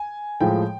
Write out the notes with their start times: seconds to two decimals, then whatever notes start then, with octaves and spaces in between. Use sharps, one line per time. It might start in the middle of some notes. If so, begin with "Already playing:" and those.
Already playing: G#5
0.41 A2 F3 G#3 G5